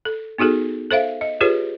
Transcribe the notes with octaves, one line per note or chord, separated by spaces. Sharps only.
A4
B3 D#4 F#4 G#4 A4
A4 C5 E5 F5
D#5
F4 G4 G#4 B4 C#5